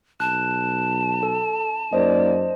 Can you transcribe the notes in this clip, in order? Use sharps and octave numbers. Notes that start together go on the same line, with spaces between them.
B1 A5 F#6
A4
F#2 A#3 D#4 C5 D5 D#5